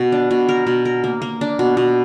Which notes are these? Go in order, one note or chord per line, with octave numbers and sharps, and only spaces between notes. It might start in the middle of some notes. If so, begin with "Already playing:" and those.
Already playing: B2
D4
B2
A#4
B2
A#4
A#3
A#3
D4
B2
B2